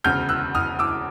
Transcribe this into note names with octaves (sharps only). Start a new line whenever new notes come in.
E1 D2 C#3 F6 G6
E6 F#6
D#6 F6
D6 E6